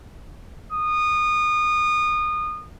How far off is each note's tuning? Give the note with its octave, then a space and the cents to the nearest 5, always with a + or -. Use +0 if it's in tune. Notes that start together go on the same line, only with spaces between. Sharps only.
D#6 -25